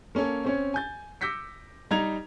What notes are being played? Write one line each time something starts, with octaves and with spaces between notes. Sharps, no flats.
A#3 C#4 A4 C#5
C4 C#4 C#5
G#5 G6 A6
D6 E6 G6 A#6 B6 C#7
G3 D#4 A#5 G#6 F7